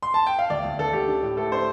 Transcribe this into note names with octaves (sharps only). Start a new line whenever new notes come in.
C6
A5
G5
F5
D2 D5
D2
D3 A4
D2 G4
D4
A2
A3 A4
D4 C5